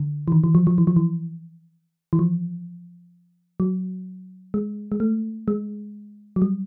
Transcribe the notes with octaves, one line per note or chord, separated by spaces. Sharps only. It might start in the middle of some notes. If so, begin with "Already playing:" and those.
Already playing: D3
E3
D#3
E3
F3
F3
E3
F3
E3
E3
F3
F#3
G#3
G#3
A3
G#3
F#3
G3